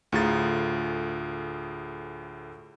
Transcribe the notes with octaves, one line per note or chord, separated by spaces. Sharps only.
D2 A2 F4 G#4 A#5 A6